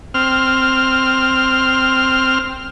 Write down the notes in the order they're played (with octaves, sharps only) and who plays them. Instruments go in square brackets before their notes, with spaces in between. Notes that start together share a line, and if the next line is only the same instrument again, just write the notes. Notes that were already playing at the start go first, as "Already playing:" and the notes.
[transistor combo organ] C4 F6